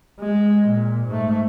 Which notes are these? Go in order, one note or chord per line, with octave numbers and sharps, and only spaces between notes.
G#3
A#2
G#2 A3